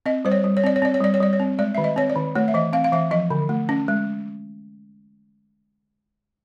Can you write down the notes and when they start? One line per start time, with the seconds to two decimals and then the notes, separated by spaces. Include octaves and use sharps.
0.06 C4 D#5
0.25 G3 C5
0.32 C#5
0.44 G3
0.57 C#5
0.63 C4 D5
0.76 C#5
0.82 C4 D5
0.94 C#5
1.01 G3 D5
1.14 C#5
1.20 G3 D5
1.33 C#5
1.40 C4
1.59 G#3 D5
1.75 D#3 E5
1.84 D#5
1.96 C4 C#5
2.10 D5
2.16 D#3
2.35 A3 C#5
2.48 E5
2.54 E3 D#5
2.73 C4 F5
2.84 F5
2.92 E3 E5
3.11 F3 D#5
3.30 D3
3.49 A3
3.69 C#4
3.88 G#3